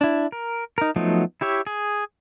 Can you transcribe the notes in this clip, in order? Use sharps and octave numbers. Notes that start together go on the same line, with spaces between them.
D4 E4
A#4
D#4 A#4
F3 F#3 A3 B3 D#4
E4 G4 C#5 E5
G#4